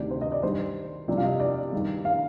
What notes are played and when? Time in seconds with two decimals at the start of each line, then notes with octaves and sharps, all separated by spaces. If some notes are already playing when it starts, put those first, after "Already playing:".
Already playing: D2 C3 D#3 D5
0.11 C5
0.21 D#5
0.32 D5
0.43 G2 D#3 C5
1.08 C2 C3 F3 D5
1.17 F5
1.24 D#5
1.40 D5
1.73 G2 D#3
2.05 F5